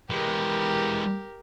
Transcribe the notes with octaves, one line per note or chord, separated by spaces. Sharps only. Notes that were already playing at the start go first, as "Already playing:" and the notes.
E3 G#3 G4 A#4